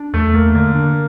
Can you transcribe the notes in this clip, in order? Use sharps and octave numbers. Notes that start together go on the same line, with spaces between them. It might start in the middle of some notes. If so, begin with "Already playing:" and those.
Already playing: D4
E2 A3
A3 A#3
D3 A#3
D4